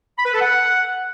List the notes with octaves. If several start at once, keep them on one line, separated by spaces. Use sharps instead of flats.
B5
B4
A4
F#5